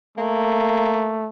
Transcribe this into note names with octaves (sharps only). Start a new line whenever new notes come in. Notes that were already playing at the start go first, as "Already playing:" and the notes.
A3 A#3